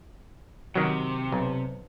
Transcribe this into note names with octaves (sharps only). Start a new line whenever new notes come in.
C3 D#3 F#3
B1